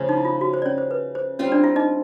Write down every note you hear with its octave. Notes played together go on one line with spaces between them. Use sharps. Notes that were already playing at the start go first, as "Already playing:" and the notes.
Already playing: C#3 F3 A3
D#4
E4
F4
F#4
C5
D5
C#4 C#5
C5
B4
C5
G3 C4 C#4 F4 C#5
D4 D5
E4 E5
D#4 D#5